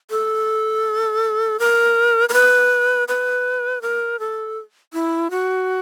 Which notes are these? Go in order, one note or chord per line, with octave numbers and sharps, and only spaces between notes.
A4
A#4
A#4
B4
B4
A#4
A4
E4
F#4